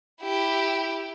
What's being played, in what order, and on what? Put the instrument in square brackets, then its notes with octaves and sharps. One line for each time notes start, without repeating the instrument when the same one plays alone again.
[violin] E4 G4